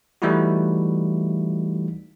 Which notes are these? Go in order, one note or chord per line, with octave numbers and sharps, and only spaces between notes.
E3 G3 A3 D#4 E4 F#4